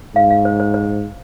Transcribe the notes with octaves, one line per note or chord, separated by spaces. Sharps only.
G#2 F5
F5
C5
C5
C5